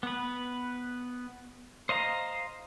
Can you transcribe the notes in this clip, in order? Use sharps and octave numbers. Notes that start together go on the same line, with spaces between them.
B3 B4
C5 D#5 F5 A#5